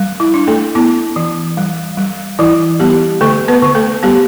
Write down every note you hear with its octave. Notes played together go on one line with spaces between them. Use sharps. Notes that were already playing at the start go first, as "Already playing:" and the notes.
Already playing: G3
E4
D4
A3 A4
B3 E4
E3
G3
G3
E3 E4
G3 B3 G4
D3 A3 A4
B3 B4
D3
A3 A4
G3 B3 G4